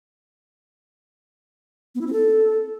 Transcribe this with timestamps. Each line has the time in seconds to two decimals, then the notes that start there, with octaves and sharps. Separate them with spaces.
1.95 B3
2.01 E4
2.07 C4
2.13 A4